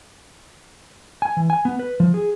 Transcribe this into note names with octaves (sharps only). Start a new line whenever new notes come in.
G#5
E3
G#5
B3
B4
F3
G#4